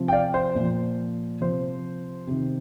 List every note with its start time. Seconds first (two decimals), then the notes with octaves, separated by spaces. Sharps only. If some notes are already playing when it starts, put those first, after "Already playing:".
Already playing: C3 F3
0.08 G5
0.12 D5 F5
0.34 C5
0.55 A#2 F3
1.41 C3 F3 C5
2.27 C3 D#3